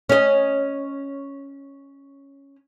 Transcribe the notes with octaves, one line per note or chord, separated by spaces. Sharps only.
C#4 D#5